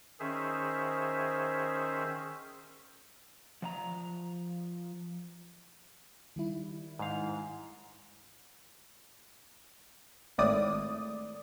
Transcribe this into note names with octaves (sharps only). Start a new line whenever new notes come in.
D#3 C#4 G#4 C5 E5
F3 F5 A#5
D#3 G3 E4
G#2 F5
G#1 A2 D5 D#6